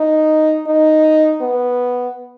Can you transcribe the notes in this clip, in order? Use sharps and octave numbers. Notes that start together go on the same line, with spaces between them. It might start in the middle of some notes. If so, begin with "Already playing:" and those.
Already playing: D#4
D#4
B3